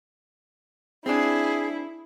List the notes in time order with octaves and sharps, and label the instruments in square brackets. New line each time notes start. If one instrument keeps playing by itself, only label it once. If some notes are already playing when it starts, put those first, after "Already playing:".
[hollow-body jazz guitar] C4 D4 [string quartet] E4 [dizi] G#4